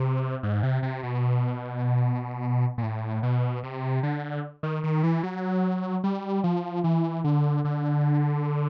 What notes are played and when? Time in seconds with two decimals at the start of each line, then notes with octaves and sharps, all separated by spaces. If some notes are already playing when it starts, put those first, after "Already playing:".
Already playing: C3
0.43 G#2
0.63 C3
0.83 C3
1.03 B2
2.78 A#2
2.83 A2
3.23 B2
3.63 C3
4.03 D3
4.63 D#3
4.84 D#3
5.03 E3
5.23 F#3
6.04 G3
6.44 F3
6.84 E3
7.24 D3
7.65 D3